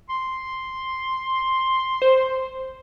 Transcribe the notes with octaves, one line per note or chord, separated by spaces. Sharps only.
C6
C5